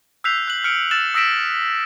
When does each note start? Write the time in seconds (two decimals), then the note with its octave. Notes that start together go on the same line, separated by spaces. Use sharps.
0.24 E6 F#6 G6 B6 C7 F7
0.48 F#6 F#7
0.64 F6 C#7 D7
0.91 E6 F6 A6 E7 F#7
1.14 D#6 E6 A#6 B6 D7 E7